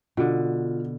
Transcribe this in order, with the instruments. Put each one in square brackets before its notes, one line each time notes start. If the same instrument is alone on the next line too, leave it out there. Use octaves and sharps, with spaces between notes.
[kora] B2 D3 [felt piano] F4